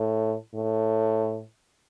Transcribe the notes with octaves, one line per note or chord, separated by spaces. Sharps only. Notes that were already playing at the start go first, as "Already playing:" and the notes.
Already playing: A2
A2